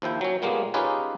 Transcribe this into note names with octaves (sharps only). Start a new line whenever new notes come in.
D#2 F3 E4 G5
F#3 C#4
A#2 G3 G#3 A#3 B3
C#4 D#4 F4 G4 G#4 B4